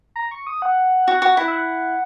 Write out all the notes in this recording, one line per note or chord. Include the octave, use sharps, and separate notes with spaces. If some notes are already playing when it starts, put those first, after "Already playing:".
A#5
C#6
D#6
F#5
F#4
F#4
E4
E5
F#5